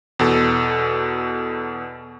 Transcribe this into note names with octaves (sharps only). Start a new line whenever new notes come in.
E2 B2 A4